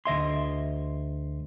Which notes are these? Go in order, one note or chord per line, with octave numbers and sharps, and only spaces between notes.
D2 D#5 E5 C6